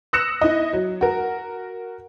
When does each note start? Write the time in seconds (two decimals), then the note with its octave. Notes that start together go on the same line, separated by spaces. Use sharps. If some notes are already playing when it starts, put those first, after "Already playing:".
0.13 D#6 E6 F#6 A#6 C#7 E7
0.41 E4 D#5
0.73 F#3
1.01 F#4 A#4